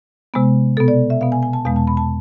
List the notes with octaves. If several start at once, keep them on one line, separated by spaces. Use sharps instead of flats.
C3 G#3 B3
B2 B3 A4
D5
E5
B2 B3 F5
G#5
G#5
A5
E2 B2 G#3 B3 F5
A5
B5
A5